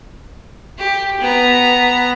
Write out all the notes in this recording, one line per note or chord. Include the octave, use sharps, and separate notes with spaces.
G4
B3 A#5